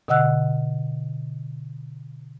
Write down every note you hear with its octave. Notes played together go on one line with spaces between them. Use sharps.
B2 D3 D#5 F#5 E6 F#6